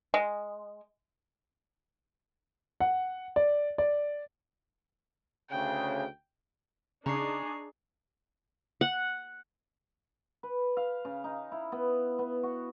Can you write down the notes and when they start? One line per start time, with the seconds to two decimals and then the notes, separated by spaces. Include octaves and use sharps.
0.14 G#3
2.80 F#5
3.36 D5
3.78 D5
5.50 D2 C#3 G5
7.06 C#3 D4 D#4 G#4 A#5 C#6 C7
8.81 F#5
10.43 B4
10.77 F5
11.05 C#3
11.24 D#4
11.52 E4
11.72 B3
12.19 B3
12.43 F#4